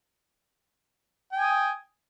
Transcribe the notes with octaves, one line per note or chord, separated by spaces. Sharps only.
G5 G#5 D#6